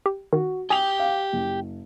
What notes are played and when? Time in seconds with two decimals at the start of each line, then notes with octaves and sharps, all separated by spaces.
0.06 G4
0.33 D#3 F#4
0.70 G4 G5 G#5 D#6 F7
1.00 F5
1.33 F#1